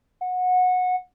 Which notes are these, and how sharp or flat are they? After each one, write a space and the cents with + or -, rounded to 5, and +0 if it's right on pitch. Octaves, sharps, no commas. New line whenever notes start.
F#5 -20